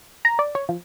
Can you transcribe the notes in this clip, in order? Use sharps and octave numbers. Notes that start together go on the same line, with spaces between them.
A#5
D5
C#5
F3